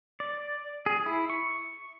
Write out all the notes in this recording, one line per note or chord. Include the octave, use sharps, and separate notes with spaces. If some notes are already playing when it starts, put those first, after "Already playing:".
D5
G#4
E4
C#6